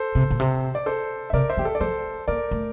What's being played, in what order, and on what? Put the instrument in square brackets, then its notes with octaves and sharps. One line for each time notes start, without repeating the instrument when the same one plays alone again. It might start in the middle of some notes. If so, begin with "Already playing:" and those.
Already playing: [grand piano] A4 C5
[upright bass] C3
A#2
C3
[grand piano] D5
A4 C5
E5
[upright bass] C3 [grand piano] A#4 D5
[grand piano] C5 E5
[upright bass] E3 [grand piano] G4
[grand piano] A4
D5
[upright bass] F3 [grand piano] A4 C5
[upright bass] A#3 [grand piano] A#4 D5
[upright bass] A3